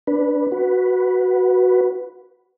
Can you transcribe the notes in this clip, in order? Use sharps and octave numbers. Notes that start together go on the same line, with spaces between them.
D4 B4
F#4 B4